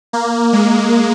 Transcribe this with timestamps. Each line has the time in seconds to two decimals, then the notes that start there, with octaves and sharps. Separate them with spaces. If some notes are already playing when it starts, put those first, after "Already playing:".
0.13 A#3
0.53 G#3